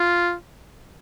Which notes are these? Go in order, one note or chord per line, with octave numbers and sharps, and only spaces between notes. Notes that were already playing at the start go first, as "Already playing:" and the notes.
Already playing: F4